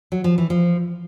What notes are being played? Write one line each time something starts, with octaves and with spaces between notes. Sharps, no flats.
F#3
F3
E3
F3